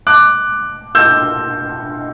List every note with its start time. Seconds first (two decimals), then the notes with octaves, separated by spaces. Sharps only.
0.07 D6 F#6
0.95 E6 G6